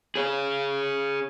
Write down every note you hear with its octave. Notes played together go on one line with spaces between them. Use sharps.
G#4 C#5